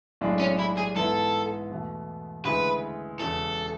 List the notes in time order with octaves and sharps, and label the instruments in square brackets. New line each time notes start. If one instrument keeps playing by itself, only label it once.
[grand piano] B1 A2 G#3 D4
[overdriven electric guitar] C#4
E4
G#4
[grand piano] G#2 E3 B3 E4 [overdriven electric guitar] A4
[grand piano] E2 B2 A3
[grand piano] D2 C#3 E3 G#3 [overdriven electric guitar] B4
[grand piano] E1 E2 C#3 [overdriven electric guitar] A4